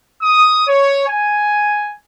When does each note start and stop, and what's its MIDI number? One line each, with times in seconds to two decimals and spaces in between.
0.22 0.63 87
0.68 1.06 73
1.07 1.95 80